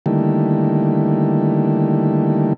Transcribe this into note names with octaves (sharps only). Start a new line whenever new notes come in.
D3 D#3 G3 A3 A#3 E4